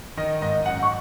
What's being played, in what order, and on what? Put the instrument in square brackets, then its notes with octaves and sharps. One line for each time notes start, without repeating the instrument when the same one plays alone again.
[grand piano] D#3 D#5
G#2 D#5
F#2 F#5
C#6